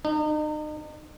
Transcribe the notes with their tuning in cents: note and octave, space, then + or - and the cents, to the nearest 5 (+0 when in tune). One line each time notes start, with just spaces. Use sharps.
D#4 -40